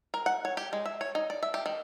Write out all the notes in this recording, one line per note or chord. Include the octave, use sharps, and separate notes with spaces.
A#4
F#5
C#5
G4
G#3
E5
C#5
D#4
D5
E5
G4
D#3